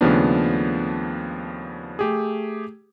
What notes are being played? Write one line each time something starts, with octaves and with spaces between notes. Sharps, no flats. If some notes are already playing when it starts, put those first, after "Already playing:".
D#2 C#3 F3 A3 B3 D4
A3 G4 G#4